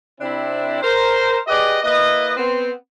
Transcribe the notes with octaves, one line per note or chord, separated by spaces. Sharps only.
C3 C4 D4 E4
A#4 C5
G4 G#4 B4 D5 D#5
A#3 E4 B4 D#5
B3 C4